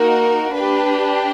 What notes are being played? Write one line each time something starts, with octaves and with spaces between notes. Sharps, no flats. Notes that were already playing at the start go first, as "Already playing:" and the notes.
Already playing: A#3 D#4 F#4 A#4
D4 G4 B4